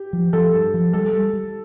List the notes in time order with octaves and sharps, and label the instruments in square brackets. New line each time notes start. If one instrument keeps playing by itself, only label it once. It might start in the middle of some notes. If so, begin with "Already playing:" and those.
Already playing: [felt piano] G4
[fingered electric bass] F3
[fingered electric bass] F3 [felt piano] A4
[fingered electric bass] G2
F3
[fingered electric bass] G3 [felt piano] A4
[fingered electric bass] G3
G3